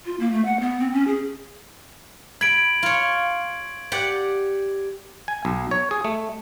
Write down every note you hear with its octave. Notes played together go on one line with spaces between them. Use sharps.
F4
A#3
A3
F#5
B3
C4
C#4
G#4
B5 G#6 D7 F#7
F4 C#5
G4 D5 F#5
G#5
B1
C#5
G#4
A3